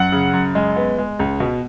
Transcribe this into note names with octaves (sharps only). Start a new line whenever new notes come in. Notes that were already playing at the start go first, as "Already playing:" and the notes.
Already playing: F#2 F#5
C#3
F#2
G#3
B3
G#3
C#2
B2